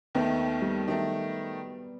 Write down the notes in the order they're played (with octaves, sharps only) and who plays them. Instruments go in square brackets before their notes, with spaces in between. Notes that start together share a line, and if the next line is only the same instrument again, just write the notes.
[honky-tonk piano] D#2 D#3 A3 [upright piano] B3
[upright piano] G3
[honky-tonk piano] D#3 A3 [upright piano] F#3